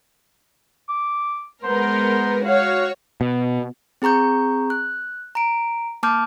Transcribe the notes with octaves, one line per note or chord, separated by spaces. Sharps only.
D6
G#3 B3 A#4 C5
F#4 C#5 F5
B2
C4 G#4 A#5 C#6 G6
F#6
A#5 D7
A#3 A5 D6 F6 G6